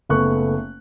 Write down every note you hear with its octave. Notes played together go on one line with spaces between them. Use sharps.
F#1 A3 B3 C#6 F#6